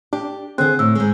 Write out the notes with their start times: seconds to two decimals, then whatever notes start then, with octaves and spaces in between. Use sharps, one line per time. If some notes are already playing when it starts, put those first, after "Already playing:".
0.13 D4 G4
0.58 D3 C4 G#4 C5 F#6
0.79 A2 E6
0.95 G#2 G#3